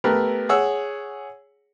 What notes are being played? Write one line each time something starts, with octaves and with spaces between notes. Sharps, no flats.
A3 B3 G4 A#4 B4
G#4 C#5 F#5 E6